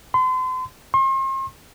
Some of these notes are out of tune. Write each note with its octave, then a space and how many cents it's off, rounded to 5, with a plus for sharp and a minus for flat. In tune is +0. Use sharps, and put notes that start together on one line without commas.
C6 -40
C6 +40